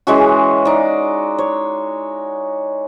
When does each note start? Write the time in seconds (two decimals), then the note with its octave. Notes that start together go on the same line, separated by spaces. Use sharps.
0.07 E3 G#3 C#4 F#4
0.65 D#4 D5
1.39 C#5